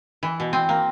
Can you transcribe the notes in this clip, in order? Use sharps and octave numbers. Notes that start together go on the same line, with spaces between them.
E3
B2
C4
A#3